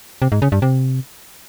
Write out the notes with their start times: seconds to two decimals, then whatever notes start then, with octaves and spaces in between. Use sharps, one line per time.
0.22 C3
0.32 G#2
0.42 C#3
0.52 G2
0.62 C3